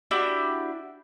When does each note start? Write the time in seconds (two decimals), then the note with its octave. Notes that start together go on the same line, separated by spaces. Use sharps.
0.11 D4 E4 F#4 G4